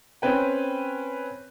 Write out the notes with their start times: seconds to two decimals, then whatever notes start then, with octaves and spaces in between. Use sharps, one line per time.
0.22 C4 C#4 B4 G5